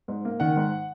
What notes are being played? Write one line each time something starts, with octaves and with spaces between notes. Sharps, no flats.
G#2
A#3
D#3 F#5
G#2